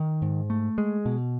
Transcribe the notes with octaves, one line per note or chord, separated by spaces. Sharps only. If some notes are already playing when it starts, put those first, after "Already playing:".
Already playing: D#3
G#2
A3
G#3
B2